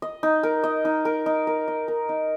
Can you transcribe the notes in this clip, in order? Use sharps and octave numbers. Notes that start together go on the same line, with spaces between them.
D#5
D#4
A#4
D#5
D#4
A#4
D#4
A#4
D#5
A#4
D#4